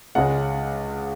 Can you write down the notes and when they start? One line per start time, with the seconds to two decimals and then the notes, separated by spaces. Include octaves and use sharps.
0.15 C#2 C#3 G#3 F#5